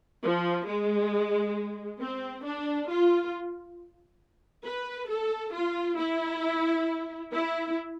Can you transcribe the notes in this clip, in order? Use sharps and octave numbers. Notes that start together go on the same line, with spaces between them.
F3
G#3
C4
D4
F4
B4
A4
F4
E4
E4